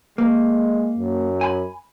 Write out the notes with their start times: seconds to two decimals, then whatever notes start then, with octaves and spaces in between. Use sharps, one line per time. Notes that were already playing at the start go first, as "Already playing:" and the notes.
0.18 G#3 A#3
0.99 F#2
1.41 G#5 B5